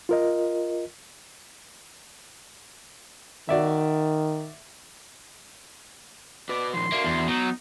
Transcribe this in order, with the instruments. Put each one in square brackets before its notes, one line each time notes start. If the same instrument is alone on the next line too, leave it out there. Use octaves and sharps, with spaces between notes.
[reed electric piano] F4 A#4 D#5
[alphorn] D#3 [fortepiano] F#4 D5 E5
[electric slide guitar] F#4 B4 [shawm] D5
[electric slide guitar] A#2 D#3 F3 [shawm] C6
[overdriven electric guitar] A#3 [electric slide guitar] F#4 D5 E5
[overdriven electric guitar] E2
[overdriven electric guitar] F#3 [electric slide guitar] B3 [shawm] D#4